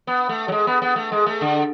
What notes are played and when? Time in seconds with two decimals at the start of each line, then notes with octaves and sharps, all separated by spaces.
0.07 B3
0.29 A3
0.48 F#3
0.52 G#3
0.67 B3
0.82 B3
0.96 A3
1.12 G#3
1.26 A3
1.41 D3